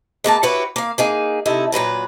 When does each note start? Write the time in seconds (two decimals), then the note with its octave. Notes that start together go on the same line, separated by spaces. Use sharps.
0.24 G#3 A#3 B3 A5
0.43 E4 F#4 G4 B4 C#5
0.76 A#3 F5
0.98 A#3 D#4 G#4
1.45 C3 D#4 E4 A4
1.72 A#2 F#3 B4 A#5